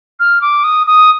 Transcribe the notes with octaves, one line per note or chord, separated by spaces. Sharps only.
F6
D6
D#6
D#6